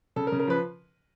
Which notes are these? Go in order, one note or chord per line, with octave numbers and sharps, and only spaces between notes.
C#3 A4
A#4
C#3
A#4
F3 B4